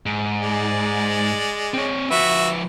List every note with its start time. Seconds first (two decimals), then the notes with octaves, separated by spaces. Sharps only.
0.06 G#2
0.41 G#3 D5
1.74 C4 C#5
2.10 F3 F#4 B4 E5